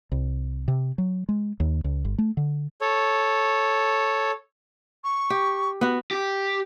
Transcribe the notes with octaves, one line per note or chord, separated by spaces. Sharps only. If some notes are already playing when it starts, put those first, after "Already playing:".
C2
C3
F#3
G#3
D#2
C#2
G1
A3
D3
A4 C#5
C#6
G4
B3 F#4
G4